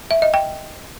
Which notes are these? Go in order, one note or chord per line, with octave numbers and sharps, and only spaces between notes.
E5
D#5
G5